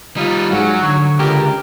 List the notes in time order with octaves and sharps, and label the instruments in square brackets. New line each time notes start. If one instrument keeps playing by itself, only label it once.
[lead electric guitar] G3 F4 [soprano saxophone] D#4
[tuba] G#2 [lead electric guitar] F#3 [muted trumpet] C#4 [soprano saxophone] F#4
[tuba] D3 [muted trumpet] C#5
[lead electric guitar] C#2 [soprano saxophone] G4 [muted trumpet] A#4